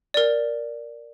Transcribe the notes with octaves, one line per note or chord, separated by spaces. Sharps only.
A#4 D5